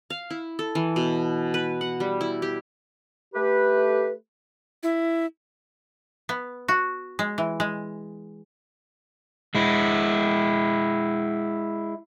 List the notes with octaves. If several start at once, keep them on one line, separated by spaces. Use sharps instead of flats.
F5
E4
A4
E3
B2
B4
F#5
G3
E4
G4
A3 G4 B4
E4
B3
F#4
G#3
E3
G#3
G#3 E4